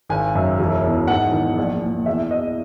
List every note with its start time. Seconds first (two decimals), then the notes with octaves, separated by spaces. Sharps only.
0.09 G#1 G#5
0.35 F#2
0.59 E1
0.84 E2
1.07 G#2 F#5
1.32 D#3
1.58 A#1
1.82 A#2
2.06 E2 E5
2.31 B2 D#5